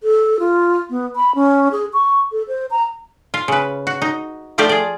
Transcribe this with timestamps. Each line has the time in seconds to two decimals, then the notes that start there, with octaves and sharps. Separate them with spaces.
0.03 A4
0.40 F4
0.90 B3
1.16 B5
1.35 C#4
1.72 G#4
1.94 C#6
2.32 A4
2.48 C5
2.71 A#5
3.34 F4
3.48 C#3 B4
3.87 F#4
4.02 D#4
4.58 F3 A3 F4 G4 C5 D5
4.69 G#4 D5